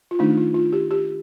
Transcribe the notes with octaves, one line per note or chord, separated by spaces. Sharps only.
F4
D#3 A3 D4 D#4
F4
F4
G4
G4